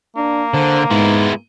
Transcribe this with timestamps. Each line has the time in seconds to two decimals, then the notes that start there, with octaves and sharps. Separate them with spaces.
0.16 A#3 D4
0.54 D3 C5
0.91 G#2 G#3 B3 E4